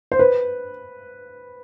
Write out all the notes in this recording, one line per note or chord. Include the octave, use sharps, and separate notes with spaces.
C5
B4